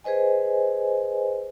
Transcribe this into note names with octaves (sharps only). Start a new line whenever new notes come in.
G#4 B4 C5 D#5 G#5